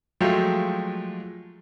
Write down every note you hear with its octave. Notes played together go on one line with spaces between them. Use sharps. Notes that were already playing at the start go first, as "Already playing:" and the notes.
F3 F#3 G#3 A3 G4